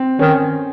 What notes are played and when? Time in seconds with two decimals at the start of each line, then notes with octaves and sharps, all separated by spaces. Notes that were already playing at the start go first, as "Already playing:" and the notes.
Already playing: C4
0.19 D#3 C#4